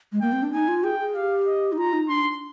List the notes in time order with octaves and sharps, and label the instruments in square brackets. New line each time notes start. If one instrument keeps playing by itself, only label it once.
[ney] G#3
[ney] A#3 [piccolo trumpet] G5
[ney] C4
D4
[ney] D#4 [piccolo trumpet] G#5
[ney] F4
[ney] G#4 [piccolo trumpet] G5
[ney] G#4
[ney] G4 [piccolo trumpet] F5
[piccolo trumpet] D#5
[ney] D#4
[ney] F4 [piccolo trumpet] A#5
[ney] D#4
[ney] D4 [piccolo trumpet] C6